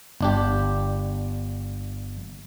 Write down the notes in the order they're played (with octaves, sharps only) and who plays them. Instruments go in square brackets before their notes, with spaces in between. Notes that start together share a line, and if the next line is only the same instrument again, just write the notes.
[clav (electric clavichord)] G1 D4 G4